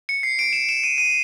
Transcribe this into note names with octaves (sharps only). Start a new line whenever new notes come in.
C#7
C7
D7
E7
E7
D#7
D#7